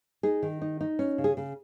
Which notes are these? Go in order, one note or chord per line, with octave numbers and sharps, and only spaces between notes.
D#4 G#4
D#3
D#4
D#4
C#4
C#3
G#4
C#3